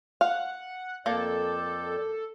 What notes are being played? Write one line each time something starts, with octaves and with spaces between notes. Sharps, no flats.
F5 F#5
F2 A#3 A4 D5 G6